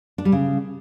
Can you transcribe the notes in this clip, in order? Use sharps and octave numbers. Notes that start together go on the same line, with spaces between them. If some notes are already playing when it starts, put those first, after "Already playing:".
D4
G3
C#3